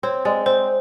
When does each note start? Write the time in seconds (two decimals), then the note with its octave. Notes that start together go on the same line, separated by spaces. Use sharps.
0.03 C4 C#5
0.25 G#3 D5
0.46 C4 C5